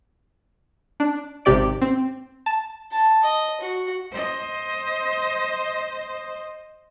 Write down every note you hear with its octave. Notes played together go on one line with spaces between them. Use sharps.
D4
G#1 C3 G4 D5 D7
C4
A5
A5
D#5
F#4
C5 D#5